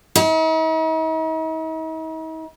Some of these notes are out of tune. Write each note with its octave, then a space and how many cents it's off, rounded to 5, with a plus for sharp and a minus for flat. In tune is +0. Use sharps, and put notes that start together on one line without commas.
D#4 +45